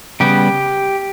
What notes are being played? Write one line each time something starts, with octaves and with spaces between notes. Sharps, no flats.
C#3 G3 B3 G4